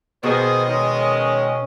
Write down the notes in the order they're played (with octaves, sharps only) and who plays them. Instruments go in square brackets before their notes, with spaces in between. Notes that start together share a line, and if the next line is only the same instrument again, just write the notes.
[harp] B2 [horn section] D#3 G#4 C5 [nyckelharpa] D#5
[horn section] D#3 G#3 [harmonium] C#4